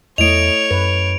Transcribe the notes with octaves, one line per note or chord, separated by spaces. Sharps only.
E2 A3 E4 C#5 D#5 D7 F7
F#2 B4